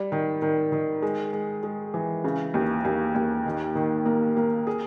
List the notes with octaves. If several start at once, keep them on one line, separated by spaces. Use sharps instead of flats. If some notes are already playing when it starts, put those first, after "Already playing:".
Already playing: G3
D#3
D#3
D#3
G#3
G#3
G#3
E3
C#3
D#2
D#2
D#2
D#3
D#3
A#3
A#3
G#4